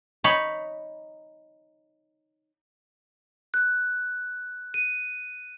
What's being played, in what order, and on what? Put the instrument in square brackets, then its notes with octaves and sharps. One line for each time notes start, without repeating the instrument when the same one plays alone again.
[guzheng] D#4 C#5 B5
[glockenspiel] F#6
D#7